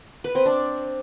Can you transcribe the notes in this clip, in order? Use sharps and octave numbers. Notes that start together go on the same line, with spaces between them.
B4
C4
D4